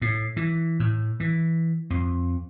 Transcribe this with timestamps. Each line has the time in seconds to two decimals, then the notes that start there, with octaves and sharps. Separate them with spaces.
0.02 A2
0.37 E3
0.80 A2
1.20 E3
1.90 F2